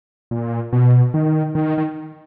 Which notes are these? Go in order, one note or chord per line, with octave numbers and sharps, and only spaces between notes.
A#2
B2
D#3
D#3
D#3